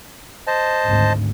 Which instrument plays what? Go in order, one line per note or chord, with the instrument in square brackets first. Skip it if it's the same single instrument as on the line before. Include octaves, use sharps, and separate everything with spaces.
[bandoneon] C5 D#5 A5
[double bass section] G#1 D2